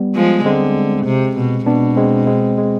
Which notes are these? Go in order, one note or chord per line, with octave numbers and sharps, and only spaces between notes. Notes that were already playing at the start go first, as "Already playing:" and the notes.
Already playing: G3 B3
F3 G#3
D3 G#3 C4
C3
B2
B2 B3 D4
G#3 C4
G#3 C4
G#3